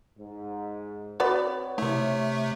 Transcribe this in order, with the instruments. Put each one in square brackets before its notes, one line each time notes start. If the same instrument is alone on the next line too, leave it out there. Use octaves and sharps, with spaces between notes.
[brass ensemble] G#2
[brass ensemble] C4 C#5 [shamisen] F#4 B4 D5
[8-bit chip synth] C3 A3 [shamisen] E4